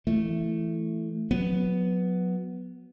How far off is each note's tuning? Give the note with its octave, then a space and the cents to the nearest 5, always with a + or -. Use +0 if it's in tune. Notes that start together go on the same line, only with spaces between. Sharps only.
E3 +10 A3 +0
F#3 -25 B3 +0